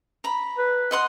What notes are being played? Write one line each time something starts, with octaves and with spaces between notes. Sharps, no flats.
A#5 B5
B4
D#5 F#5 C6